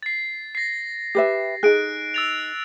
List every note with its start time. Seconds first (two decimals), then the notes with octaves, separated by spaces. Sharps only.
0.03 A6 C7
0.55 A#6 C7
1.15 G4 B4 E5
1.63 D#4 G#4 F#6 D7
2.14 E6 A6 F7